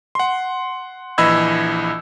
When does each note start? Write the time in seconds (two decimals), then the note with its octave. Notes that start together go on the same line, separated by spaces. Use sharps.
0.15 F#5 C6
1.18 A#1 E3 D#5 B5 E6 G#6